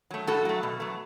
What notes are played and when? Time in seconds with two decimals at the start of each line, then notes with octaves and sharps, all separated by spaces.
0.11 F#3 A3
0.27 A2 F#4 A4
0.45 F#3 A3
0.63 B2
0.80 F#3 A3